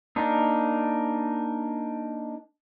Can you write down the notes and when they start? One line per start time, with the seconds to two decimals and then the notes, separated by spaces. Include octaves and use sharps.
0.16 A#3 D4 D#4